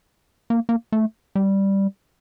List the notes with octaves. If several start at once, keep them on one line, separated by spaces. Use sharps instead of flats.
A#3
A#3
A3
G3